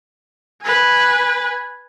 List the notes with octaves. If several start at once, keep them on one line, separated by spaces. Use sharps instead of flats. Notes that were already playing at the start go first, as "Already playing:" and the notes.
B4 G#5